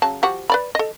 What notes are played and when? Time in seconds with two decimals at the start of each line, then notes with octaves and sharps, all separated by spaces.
0.02 C#3 F#3 A5
0.23 F3 F#4 G4
0.50 B4 D5 B5
0.75 A4 D#5